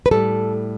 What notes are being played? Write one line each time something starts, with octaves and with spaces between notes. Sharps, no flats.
B4
A2 G3 A4